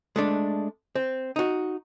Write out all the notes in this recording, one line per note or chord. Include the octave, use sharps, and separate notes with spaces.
G#3 A3 D4
C4
D#4 F#4